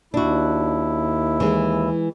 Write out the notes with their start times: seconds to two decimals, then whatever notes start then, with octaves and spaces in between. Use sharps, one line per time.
0.14 D#2 D4 E4 F#4
1.40 E3 G#3